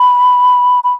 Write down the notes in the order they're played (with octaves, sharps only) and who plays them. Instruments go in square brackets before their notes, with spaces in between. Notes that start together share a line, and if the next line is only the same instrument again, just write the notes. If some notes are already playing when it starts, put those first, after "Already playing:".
Already playing: [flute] B5
B5